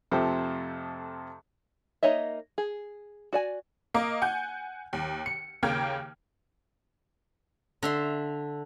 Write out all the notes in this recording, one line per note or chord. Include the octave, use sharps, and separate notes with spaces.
F2 C3 F3 A3 G4 C5
A#3 D#4 C#5 D#5 E5
G#4
F#4 D5 G#5
A#3 A#4 D#5 D6
F#5 G#5 G6
D#2
C#7
D#2 C#3 A#3 G5 F6 G#6
D3 E5 C6